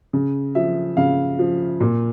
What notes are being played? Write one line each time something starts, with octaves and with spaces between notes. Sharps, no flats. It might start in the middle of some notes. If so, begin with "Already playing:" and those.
C#3
F3 E5
C#3 F5
F3
A#2